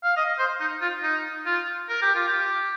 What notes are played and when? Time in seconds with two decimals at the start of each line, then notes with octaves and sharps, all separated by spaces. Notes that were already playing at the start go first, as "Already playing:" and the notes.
0.04 F5
0.17 D#5
0.39 C5
0.60 D#4
0.82 F4
1.03 D#4
1.46 F4
1.89 A#4
2.02 G4
2.15 F4
2.28 G4